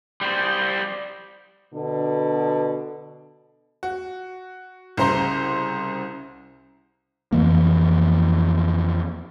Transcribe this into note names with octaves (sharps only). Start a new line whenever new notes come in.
G3 C5
B2 D3 B3 D4
F#4
C2 C#3 C5 A#5 C6
F2 E3 A#3